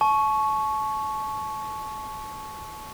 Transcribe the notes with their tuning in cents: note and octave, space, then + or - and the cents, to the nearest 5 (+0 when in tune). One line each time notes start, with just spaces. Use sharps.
A5 -35 C#6 +0